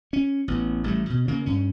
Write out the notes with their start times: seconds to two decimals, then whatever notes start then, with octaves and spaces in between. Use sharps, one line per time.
0.13 C#4
0.48 A1 B3
0.84 A1 G3 A3
1.10 B2
1.28 C#3 A#3
1.46 G2 C#4